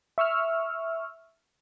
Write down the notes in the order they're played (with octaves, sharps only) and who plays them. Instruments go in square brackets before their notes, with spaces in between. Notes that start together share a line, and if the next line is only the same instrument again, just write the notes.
[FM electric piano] E5 C#6 E6 F6